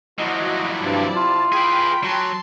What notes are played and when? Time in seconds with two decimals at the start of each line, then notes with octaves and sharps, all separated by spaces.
0.19 F3 F#3 E4 F#4 D5 D#5
0.80 G2 C3 A5
1.16 F4
1.53 G#4 B4 G5 B5
2.03 F#3 A5 C6